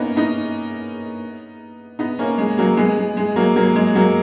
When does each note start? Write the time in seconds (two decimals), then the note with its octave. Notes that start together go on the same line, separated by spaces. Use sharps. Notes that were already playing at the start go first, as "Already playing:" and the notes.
Already playing: A#3 B3 C#4 D#4
0.16 B3 D#4
1.99 B3 D#4
2.19 A#3 C#4
2.38 G#3
2.58 F#3 A#3
2.77 G#3 B3
2.98 G#3
3.17 G#3
3.36 F#3 A#3
3.56 F#3 A#3
3.76 G#3
3.95 F#3 A#3